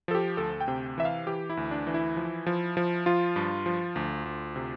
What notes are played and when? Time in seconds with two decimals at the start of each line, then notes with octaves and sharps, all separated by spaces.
0.08 F3 A4
0.15 G4
0.37 D2 A4
0.61 G5
0.68 C3
0.98 E3 E5
1.05 F5
1.27 E3 G4
1.50 E4
1.57 D2
1.71 D4
1.87 E3
1.94 E4
2.17 F3
2.46 F3
2.77 F3
3.06 F3 F4
3.36 G2
3.66 F3
3.96 D2
4.25 D2
4.56 C3